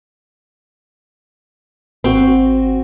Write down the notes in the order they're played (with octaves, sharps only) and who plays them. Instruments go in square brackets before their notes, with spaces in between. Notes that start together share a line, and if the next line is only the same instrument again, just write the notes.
[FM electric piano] G#1 F#4 [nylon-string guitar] C4